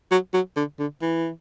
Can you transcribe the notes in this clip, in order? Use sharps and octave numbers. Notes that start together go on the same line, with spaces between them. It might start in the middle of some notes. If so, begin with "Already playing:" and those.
F#3
F#3
D3
D3
E3